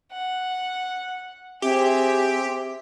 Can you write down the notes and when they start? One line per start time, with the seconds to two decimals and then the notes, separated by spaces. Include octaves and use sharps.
0.12 F#5
1.62 C4 G4 G#4 E5